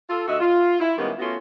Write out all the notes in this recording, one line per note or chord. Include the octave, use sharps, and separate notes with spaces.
F4 A4
D2 F#4 D#5 E5
F4
E4
D#3 G3 G#3 A#3 B3 C#4
A3 B3 C#4 F4 F#4